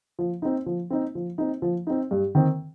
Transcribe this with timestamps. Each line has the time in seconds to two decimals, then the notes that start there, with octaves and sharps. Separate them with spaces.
0.19 F3
0.42 C4 D#4
0.66 F3
0.90 C4 D#4
1.15 F3
1.38 C4 D#4
1.62 F3
1.87 C4 D#4
2.11 G2
2.35 D#3 C4